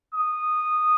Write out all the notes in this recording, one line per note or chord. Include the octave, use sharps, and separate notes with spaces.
D#6